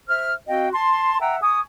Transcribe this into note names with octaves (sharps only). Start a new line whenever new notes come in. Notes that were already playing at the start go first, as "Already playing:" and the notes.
C5 E5 F6
C4 F#4 D#5 F5 G5
A5 C6
E5 F#5 G5 A#5
G#5 C#6 D#6